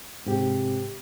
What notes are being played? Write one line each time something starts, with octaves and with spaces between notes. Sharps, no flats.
G#2 C3 G4